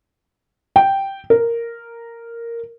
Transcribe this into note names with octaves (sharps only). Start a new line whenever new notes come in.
G5
A#4